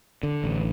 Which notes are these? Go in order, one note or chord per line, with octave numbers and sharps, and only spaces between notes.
D3
A1